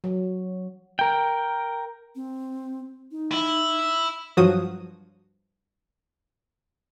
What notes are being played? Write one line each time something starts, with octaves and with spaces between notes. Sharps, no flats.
F#3
A#4 G5
C4
D#4
E4
G2 F3 F#3 F#4 D#6